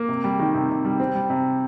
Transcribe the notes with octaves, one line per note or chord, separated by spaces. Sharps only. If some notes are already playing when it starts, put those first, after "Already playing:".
Already playing: A#3
C3
G3
D#3
C3
C3
G3
C4
G3
C3